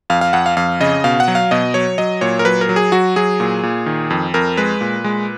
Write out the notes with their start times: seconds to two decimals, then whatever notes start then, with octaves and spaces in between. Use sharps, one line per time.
0.10 F2 F5
0.21 F5
0.33 F2 F#5
0.46 F5
0.57 F2 F5
0.80 C#3 D#5
1.04 B2 F5
1.20 F#5
1.28 F#3
1.35 F5
1.51 B2 D#5
1.74 F#3 C#5
1.98 F#3 D#5
2.21 A#2 C#5
2.39 A#4
2.45 F#3 B4
2.61 A#4
2.69 F#3
2.76 G#4
2.92 F#3 F#4
3.16 F#3 G#4
3.40 A#2
3.63 A#2
3.86 D#3
4.10 F2
4.34 F2 A#4
4.57 G#3 B4
4.81 A#2
5.04 G#3